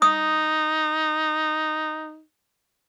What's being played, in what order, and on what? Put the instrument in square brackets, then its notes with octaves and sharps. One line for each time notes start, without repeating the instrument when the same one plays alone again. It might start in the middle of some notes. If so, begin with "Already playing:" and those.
[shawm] D#4 [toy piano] D#6